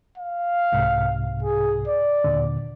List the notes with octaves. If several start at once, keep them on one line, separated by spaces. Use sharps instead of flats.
F5
C2 G#2 C3
G#4
D5
D#2 A#2 D3